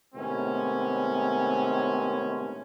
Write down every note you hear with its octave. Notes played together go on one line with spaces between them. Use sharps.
A2 C3 D#3 G#3 B3 C#4